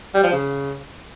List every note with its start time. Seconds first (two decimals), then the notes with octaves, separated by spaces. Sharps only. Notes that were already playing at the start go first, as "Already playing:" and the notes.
0.14 G3
0.23 F3
0.32 C#3